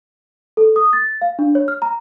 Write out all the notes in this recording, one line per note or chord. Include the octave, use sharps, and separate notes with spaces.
A4
D#6
A6
F5
D4
C#5
F6
A#5